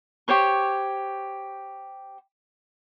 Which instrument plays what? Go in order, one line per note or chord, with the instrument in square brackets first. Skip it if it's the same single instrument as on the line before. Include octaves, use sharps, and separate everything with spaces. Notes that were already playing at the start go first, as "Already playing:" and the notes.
[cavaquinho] G4 C5 C#5 C#6